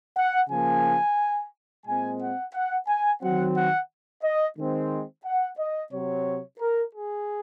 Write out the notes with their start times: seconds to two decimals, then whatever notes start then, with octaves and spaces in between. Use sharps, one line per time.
0.17 F#5
0.50 C#3 F3 A#3 G#5
1.86 A#2 G#3 C4 G#5
2.20 F#5
2.53 F#5
2.88 G#5
3.22 D#3 F#3 C4 F#5
3.55 F#5
4.23 D#5
4.57 D#3 G#3 C4
5.25 F#5
5.58 D#5
5.93 C3 F#3 C4 C#5
6.60 A#4
6.94 G#4